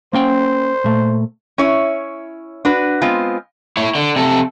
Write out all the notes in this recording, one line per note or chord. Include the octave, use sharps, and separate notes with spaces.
A#3 C#4 C5 G5
A#2 A3
C#4 E4 C#5
D4 F#4 B4
G#3 B3 C4 F4
E4 C#5
D3
C3 A4